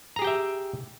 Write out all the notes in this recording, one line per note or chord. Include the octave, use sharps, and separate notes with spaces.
G4 G#4 E5 G5 A#5